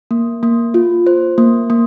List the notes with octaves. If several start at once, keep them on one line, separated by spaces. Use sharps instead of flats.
A#3
A#3
F4
C5
A#3
A#3